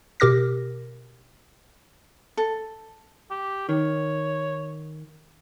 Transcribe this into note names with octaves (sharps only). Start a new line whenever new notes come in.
B2 G4 A#4 D6 F6 A#6
A4
G4
D#3 C#5